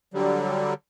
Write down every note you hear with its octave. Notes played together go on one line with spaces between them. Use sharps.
D3 F#3 G3